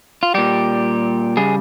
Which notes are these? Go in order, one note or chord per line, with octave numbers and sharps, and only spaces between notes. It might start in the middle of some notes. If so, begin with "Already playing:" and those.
F4
A#2 G3 G4
C#3 G3 G#4